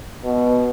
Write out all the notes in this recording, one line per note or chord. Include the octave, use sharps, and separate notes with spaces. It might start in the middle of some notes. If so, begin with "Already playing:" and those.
B2